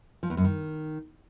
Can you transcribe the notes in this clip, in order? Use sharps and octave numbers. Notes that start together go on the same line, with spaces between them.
F3
E2
F#2
D#3